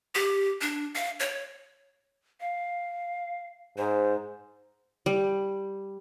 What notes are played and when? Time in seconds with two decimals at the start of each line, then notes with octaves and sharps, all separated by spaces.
0.15 G4
0.61 D4
0.95 F5
1.20 C#5
2.41 F5
3.78 G#2 C5
5.06 G3